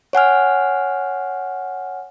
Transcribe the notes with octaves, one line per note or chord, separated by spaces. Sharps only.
C#5 F#5 G#5 F6